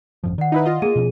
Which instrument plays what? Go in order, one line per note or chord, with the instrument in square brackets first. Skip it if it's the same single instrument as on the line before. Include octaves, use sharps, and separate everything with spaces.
[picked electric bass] G1 F#2 F3
[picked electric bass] D#3 [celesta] D5 F#5
[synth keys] D#4 E4 B4
F4 D#5
[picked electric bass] A3 A#3 [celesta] G#4 D#7
[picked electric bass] B2 F3 C#4